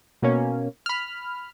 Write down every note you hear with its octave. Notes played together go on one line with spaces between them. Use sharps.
B2 A#3 C#4
B5 F6